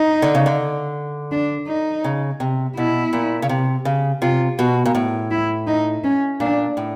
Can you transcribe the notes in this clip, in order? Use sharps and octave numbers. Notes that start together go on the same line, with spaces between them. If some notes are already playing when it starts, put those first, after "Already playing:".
Already playing: D#4
D3
C#3
D3
D4
D#4
C#3
C3
B2 E4
A#2
C#3
C3
C#3
C3 F4
B2 F#4
A#2
A2
E4
D#4
C#4
A#2 D4
A2